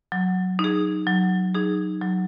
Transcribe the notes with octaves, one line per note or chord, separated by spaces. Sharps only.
F#3
D#4
G#4
F#3
D#4 G#4
F#3